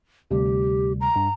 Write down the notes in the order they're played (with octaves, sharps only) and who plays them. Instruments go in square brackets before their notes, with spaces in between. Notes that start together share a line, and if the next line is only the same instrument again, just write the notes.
[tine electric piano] D2 C3 G3 [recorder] G4
[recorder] A#5
[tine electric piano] G2